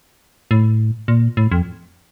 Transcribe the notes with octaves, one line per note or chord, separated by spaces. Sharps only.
A2
A#2
A2
F2